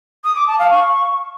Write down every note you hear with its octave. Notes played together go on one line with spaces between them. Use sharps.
D#6
D6
A5
F5
C#6